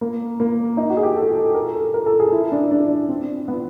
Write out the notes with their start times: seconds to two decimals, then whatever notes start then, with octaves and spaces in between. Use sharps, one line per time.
0.01 A#3
0.40 A#3
0.77 D#4
0.90 F#4
0.97 G#4
1.03 G4
1.16 A4
1.36 A4
1.54 A#4
1.75 A4
1.94 A#4
2.06 A4
2.20 G#4
2.32 E4
2.52 D4
2.71 D4
3.09 C4
3.48 B3